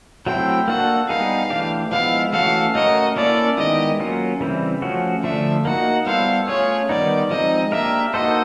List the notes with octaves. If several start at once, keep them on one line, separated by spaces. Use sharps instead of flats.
F#3 A3 C4 E4 G5
A#3 D4 F#4 A4 F#5
G3 B3 D#4 G#4 F5
E3 A3 D4 G4
F3 G#3 B3 E4 F5
E3 A3 C#4 F#4 A4 F5
A3 C#4 F#4 A#4 C#5 D#5
A#3 C#4 E4 A4 C#5 D5
D#3 G#3 B3 E4 G4 D#5
F#3 A#3 C#4 F4
C#3 E3 G3 C4 E4
F3 A3 C#4 F#4
D3 F3 A3 D4 E5
A#3 D#4 F#4 F#5
G3 B3 E4 A4 C5 F5
A3 C#4 F4 G#4 C#5
D#3 G3 B3 D#4 D5
F3 G#3 C4 D#4 D#5
A#3 D4 G4 A#4 E5
A#3 D#4 F#4 A4 C5 D#5